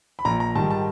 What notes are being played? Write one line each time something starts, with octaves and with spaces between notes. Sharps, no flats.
B5
A#1 A#5
A#5
G#2 D#3 G3 A5
A5